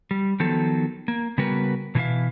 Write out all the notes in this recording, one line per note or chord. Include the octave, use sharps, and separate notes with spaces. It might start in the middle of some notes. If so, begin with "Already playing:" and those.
G3
D#3 F3 F#3 B3 A4
A#3
C#3 G3 B3 F#4 A#4 B4
B2 E3 C#4 E4 E5 F5